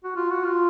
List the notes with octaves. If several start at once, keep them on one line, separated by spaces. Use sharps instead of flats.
F#4
F4
F#4
F4